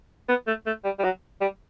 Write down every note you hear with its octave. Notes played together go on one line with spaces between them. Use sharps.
B3
A3
A3
G3
G3
F#3
G3